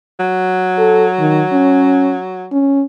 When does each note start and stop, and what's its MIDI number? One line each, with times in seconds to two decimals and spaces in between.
0.19 2.46 54
0.78 1.06 69
1.19 1.44 51
1.52 2.17 61
2.52 2.84 61